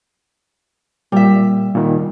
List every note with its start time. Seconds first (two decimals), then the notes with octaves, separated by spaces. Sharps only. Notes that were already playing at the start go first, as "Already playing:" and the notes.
1.12 A#2 G3 E5
1.75 A#2 D#3